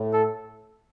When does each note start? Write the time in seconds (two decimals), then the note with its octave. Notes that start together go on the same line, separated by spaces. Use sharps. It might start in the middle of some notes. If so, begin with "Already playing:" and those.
Already playing: A2
0.13 A4